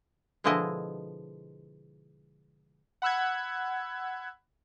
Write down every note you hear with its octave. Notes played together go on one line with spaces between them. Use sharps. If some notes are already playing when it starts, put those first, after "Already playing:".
B2 D3 F3 G#3 E4 D#5
F#5 B5 E6 F#6 G#6